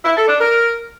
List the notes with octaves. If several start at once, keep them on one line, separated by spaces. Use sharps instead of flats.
E4
A4
D4
A#4